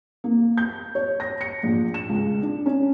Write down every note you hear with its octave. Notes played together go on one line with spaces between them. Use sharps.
A#3
G6
C#5
A#6
C#7
A#1
E7
C#2
D4
C#4